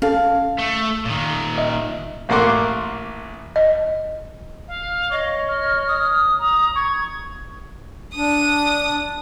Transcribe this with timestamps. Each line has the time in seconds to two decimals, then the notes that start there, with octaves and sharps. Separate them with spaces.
0.02 C#4 A4 F5 A5
0.58 A3
1.05 A#2 D#3
1.58 D#5 E5
2.29 A1 A3 A#3 F#5 C6 D6
3.56 D#5
4.68 F5
5.11 C#5 D#5
5.48 F6
5.88 D#6
6.39 A#5
6.76 C#6 G#6
8.16 D4 D#6